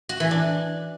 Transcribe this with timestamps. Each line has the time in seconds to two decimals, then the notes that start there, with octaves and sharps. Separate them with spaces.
0.09 F#4
0.20 E3
0.31 D4